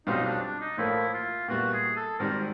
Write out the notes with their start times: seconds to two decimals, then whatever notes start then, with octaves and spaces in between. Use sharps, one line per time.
0.07 B1 B2 G3 C4 D#4 F4
0.25 D4
0.42 D4
0.60 D#4
0.77 A1 A2 F3 A#3 E4
1.14 F4
1.48 A#2 G3 B3 E4 F#4
1.73 G#4
1.96 A4
2.19 G#1 G#2 D#3 G3 C4 A#4